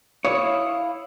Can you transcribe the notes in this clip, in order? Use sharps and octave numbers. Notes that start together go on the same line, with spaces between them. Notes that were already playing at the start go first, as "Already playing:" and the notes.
E4 C#5 F5 D#6